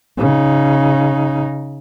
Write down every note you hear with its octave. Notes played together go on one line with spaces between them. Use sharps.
C#3 D#4